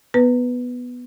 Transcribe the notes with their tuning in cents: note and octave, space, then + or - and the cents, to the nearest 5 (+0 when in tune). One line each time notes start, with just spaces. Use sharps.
B3 +0 B4 +0